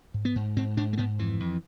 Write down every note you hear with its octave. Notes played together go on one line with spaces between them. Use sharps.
G#2
B3
G#2
G#2 C4
G#2 D4
A3
G#2 B3
F2 E3
F2